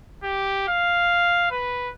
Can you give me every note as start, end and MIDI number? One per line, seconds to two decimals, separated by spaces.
0.24 0.66 67
0.68 1.50 77
1.51 1.91 71